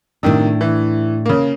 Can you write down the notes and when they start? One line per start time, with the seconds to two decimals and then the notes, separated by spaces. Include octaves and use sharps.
0.23 A2 C3 D#3 D4
0.61 E3
1.26 C#3 A#3